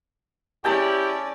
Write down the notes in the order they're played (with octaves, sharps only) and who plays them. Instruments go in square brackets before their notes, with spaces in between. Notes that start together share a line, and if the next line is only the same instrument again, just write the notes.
[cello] C#4 D5 [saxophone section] E4 G4 [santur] G#4 G5 A5